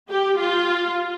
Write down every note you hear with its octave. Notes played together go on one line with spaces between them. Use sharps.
G4
F4